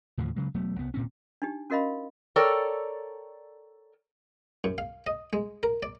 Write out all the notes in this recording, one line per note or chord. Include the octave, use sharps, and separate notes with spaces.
D#2 A2 D3 F3
C#3 F#3 G#3
E1 F#3 A3 B3
C2 B3
D#1 A#2 C4 C#4
D4 D#4 G4
C#4 F#4 A#4 D#5 F5 B5
A4 A#4 C#5 D5 G5
F#2
F5
D#5
G#3
A#4
D5